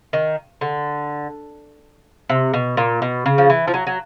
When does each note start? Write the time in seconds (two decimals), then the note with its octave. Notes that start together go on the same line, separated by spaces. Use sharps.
0.13 D#3
0.61 D3
2.30 C3
2.53 B2
2.77 A#2
3.02 B2
3.26 C#3
3.38 F3
3.50 E3
3.67 F3
3.74 F#3
3.87 F#3